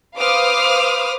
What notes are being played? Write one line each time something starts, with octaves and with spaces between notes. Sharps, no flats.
B4 C5 F5 D6 D#6 F6